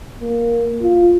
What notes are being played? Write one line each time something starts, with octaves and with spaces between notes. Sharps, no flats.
A#3
F4